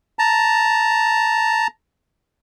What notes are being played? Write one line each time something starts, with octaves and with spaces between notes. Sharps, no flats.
A5 A#5